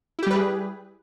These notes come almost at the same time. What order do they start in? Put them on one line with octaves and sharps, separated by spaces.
E4 G4 G3 B4 G#4